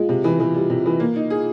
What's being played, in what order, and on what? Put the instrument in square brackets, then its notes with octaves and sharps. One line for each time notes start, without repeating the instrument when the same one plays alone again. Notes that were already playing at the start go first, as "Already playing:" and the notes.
Already playing: [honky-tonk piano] G#3 [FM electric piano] F4
[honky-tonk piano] C3
E3
E3
G3
C3
E3
A#3
D#4
G#4